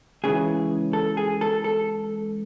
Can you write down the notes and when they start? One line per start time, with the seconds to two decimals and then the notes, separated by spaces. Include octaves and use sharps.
0.24 C#2 C#3 E3 G#4
0.93 A4
1.17 G#4
1.41 A4
1.64 A4